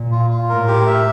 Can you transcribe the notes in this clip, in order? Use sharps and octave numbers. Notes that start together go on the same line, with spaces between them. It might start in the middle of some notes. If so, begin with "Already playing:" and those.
Already playing: A#2
F4
F4
A2 A#4
G4
E5